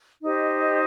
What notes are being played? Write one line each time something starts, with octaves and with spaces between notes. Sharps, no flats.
D#4 G4 C5 D#5